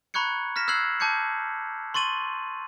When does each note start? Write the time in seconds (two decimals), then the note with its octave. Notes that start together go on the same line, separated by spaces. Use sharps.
0.14 A#5 B5 C#6 F#6 G#6 C#7
0.56 F6 A#6 B6 E7
0.68 E6 F#6 G#6 C7 F#7
1.00 A5 D6 G6 G#6 C#7
1.94 C6 C#6 A6 D#7 F#7